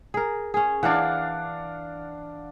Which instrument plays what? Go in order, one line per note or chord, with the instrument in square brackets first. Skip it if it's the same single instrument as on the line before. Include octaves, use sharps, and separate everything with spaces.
[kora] G#4 A#4
C#4 G#4
[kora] E3 D5 [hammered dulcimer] D4 F5 F#5